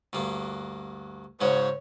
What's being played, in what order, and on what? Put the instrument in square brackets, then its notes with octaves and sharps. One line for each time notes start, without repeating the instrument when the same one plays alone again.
[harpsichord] D2 G2 A#3
[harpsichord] G#2 C#3 F#4 [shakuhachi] C5 [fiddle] C#5